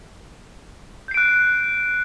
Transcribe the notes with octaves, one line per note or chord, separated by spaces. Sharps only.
F#6 G6 C7 D7